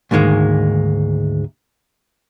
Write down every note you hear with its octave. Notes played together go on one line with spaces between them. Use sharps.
D2 G#2 D#3 G#3 A#3